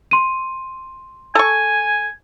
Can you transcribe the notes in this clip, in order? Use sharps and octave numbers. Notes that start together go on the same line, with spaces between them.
C6 D#7
A4 G#5 C#6